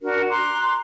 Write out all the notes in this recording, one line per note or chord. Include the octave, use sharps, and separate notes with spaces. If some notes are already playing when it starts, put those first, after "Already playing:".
D4 F#4 A#4
A#5 C6 D6 F#6